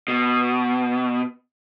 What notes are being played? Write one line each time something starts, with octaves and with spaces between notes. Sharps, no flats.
B2